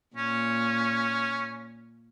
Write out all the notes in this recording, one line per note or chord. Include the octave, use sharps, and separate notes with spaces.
A#2 C#4